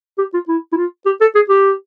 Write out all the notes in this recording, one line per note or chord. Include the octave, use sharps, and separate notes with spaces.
G4
F4
E4
E4
F4
G4
A4
G#4
G4